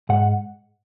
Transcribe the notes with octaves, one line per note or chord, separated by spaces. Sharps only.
G#2 F#5